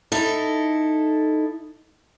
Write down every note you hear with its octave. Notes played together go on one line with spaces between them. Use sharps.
D#4 E4 A4